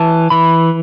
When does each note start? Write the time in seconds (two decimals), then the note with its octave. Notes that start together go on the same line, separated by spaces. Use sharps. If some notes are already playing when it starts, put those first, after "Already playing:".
Already playing: E3 A5
0.30 E3 B5